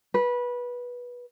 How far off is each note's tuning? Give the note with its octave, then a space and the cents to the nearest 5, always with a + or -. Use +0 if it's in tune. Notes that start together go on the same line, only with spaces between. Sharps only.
B4 -20